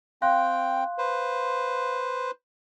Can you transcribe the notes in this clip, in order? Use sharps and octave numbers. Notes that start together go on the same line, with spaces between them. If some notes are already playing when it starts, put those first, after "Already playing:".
C4 F5 G5 C6 F#6
B4 C5